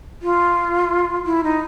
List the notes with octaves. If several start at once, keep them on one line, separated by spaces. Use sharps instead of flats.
F4
E4
D#4